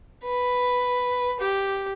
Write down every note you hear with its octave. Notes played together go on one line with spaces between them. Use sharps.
B4
G4